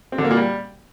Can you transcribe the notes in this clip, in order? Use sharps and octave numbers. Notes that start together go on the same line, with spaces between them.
C4
D3
A#3
A#2
G3